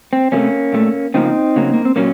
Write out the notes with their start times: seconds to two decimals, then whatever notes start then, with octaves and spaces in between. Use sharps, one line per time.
0.13 C4
0.32 C3 F#3 A3 A#3 C#4
0.73 A#2 A3
1.14 C#3 F3 A#3 C4 D#4
1.56 C#3 F#3 A#3
1.74 A#3
1.85 C4
1.96 A#2 F#3 A#3 C#4